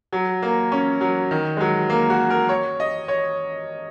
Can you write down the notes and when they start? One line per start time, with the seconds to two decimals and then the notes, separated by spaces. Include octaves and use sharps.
0.13 F#3
0.42 A#3
0.72 C#4
1.01 F#3
1.31 D#3
1.57 G#3
1.60 F#3
1.90 A#3
2.10 F#4
2.30 A#4
2.49 C#5
2.80 D#5
3.08 C#5